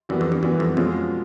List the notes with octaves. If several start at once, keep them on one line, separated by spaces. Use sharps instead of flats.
F#2 E3 G3 B3
F2
G2
F#2 E3 G3 B3
F2
F2 B2 G#3 C#4 F4